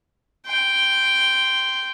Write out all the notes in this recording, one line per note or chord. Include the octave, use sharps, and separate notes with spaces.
G5 C6